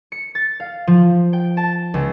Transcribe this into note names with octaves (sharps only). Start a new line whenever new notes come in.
C#7
A6
F5
F3
G5
A5
C#2